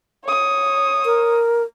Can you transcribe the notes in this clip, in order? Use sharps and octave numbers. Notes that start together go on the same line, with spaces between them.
C#5 D#6
A#4